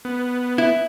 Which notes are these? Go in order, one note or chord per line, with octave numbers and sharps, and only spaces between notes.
B3
E4